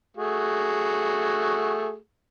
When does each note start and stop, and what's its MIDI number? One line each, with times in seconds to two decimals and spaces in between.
0.17 1.96 57
0.17 1.96 66
0.17 1.96 68